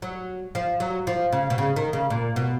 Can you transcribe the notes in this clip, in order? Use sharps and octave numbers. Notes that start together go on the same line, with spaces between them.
F#3
F3
F#3
F3
C#3
B2
C#3
D#3
C#3
A#2
B2